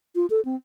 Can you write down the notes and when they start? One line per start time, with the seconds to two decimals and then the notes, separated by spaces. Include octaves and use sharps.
0.16 F4
0.30 A4
0.45 C4